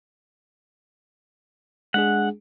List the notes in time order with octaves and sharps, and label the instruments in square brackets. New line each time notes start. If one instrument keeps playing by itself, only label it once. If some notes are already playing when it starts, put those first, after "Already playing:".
[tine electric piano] G#3 D4 G#4 [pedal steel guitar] F#5